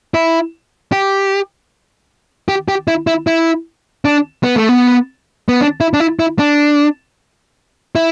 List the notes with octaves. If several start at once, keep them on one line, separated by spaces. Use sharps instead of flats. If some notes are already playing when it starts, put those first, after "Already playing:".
E4
G4
G4
G4
E4
E4
E4
D4
B3
A3
B3
B3
D4
E4
D4
E4
E4
D4
E4